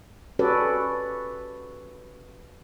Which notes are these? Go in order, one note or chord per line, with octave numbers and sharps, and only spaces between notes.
C#4 F#4 G4 A4 B4 D5